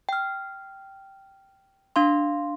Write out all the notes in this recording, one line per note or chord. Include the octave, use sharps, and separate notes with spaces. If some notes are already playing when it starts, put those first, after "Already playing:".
G5 F6
D4 F5 C6